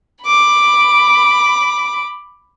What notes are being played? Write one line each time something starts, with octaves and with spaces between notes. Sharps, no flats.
B5 D6